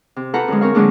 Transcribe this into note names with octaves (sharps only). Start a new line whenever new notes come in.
C3
F4 A4 B4 C5 F#5 A#5
F#2 D3 G#3
C4 A#4 C#5 F5
A#2 D3 F#3 G#3 A#3 D4